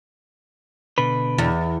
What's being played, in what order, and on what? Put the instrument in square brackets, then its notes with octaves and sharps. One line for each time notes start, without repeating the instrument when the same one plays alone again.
[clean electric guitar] B2 D3 B4
[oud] E2